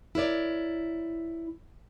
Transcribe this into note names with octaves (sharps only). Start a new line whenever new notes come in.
E4 A#4 C#5 D5